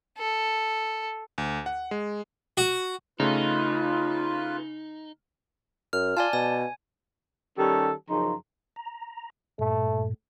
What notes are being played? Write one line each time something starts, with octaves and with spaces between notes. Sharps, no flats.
A4
D2
F#5
G#3
F#4
C#3 A3 D#4 F4 B4
F#2 F6
F4 D5 G#5 A5
B2 G#5
D#3 G3 C#4 G4 A4
F#2 C#3 F3 D#4 A#5 C6
A#5
G2 A#2 A3